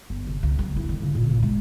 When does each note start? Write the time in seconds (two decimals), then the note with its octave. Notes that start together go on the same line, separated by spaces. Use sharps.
0.10 G1
0.27 C3
0.43 C#2
0.59 F#3
0.76 E4
0.89 D#3
1.02 C#3
1.15 A#2
1.30 A1
1.43 G#3